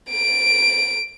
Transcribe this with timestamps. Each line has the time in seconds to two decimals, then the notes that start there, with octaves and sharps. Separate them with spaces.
0.10 D7